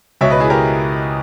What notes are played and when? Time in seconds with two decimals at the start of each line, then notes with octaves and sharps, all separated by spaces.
0.21 C#2 B2 C#5 E5
0.30 B4 D#5
0.40 E4 G#4
0.50 G4 A#4